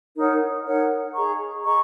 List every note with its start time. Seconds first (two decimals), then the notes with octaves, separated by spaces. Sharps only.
0.16 D#4 A#4 C#5 F#5
0.66 D#4 A#4 C#5 F#5
1.14 G#4 D#5 A#5 C#6
1.63 G#4 D#5 A#5 C#6